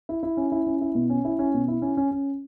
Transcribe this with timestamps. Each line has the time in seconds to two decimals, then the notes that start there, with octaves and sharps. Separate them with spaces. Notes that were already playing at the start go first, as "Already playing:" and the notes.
0.09 E4
0.23 E4
0.37 C#4
0.52 E4
0.67 C#4
0.81 E4
0.95 B2
1.10 C#4
1.25 E4
1.39 C#4
1.54 B2
1.68 E4
1.82 C#4
1.97 C#4
2.11 C#4